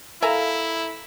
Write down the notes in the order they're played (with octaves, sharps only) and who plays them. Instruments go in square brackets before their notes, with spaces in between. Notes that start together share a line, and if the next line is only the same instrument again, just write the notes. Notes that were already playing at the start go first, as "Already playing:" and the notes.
[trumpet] E4 [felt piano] A4 F5 [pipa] E5 G#5 A#5